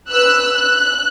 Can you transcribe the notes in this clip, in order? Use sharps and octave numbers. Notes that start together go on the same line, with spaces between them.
B4 E6 F#6
F#6